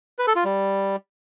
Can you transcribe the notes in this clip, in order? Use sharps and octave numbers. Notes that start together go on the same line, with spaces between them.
B4
A4
F4
G3